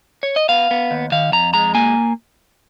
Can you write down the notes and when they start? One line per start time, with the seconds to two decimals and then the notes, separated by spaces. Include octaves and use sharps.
0.23 C#5
0.36 D#5
0.49 B3 F5
0.71 B3
0.91 D#2
1.12 D#3 F5
1.32 F2 A#5
1.54 G#3 A#5
1.75 A#3 G#5